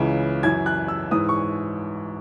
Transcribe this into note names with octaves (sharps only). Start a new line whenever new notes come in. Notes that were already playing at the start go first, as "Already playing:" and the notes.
Already playing: C#2 C#3 E3
F#2 E3 G#6
F#6
E6
G#2 E3 D#6
C#6